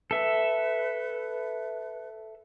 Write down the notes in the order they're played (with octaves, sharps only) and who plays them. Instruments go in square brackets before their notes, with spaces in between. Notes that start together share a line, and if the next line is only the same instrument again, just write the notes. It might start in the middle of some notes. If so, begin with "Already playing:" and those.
[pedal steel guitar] A4 E5 [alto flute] B4